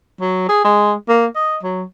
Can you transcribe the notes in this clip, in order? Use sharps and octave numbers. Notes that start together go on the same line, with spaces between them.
F#3
G#4
G#3
A#3
D#5
F#3